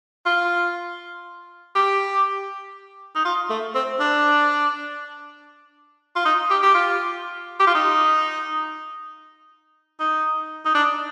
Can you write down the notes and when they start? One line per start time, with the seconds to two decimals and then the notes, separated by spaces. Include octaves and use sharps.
0.25 F4
1.75 G4
3.15 D#4
3.25 F4
3.50 A3
3.75 C4
4.00 D4
6.16 F4
6.25 D#4
6.50 G4
6.63 G4
6.74 F4
7.60 G4
7.67 F4
7.75 D#4
10.00 D#4
10.65 D#4
10.75 D4